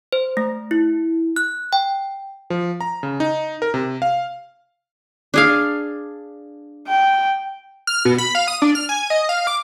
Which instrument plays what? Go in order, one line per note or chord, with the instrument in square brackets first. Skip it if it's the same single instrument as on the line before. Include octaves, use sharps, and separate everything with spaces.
[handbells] C5
A3
E4
F#6
G5
[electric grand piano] F3
A#5
C#3
D#4
A#4
C3
F5
[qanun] D4 G#4 F5
[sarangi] G5
[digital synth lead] F6
B2
B5
F5
D#6
D4
F6
G#5
D#5
F5
D6